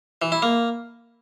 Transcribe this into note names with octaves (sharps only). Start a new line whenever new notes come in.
E3
E4
A#3